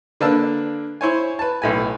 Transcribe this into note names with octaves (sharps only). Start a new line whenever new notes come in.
D3 A#3 B4 D5 A5 E6
E4 C5 C#5 G#5
B4 A5
B1 A2 G#5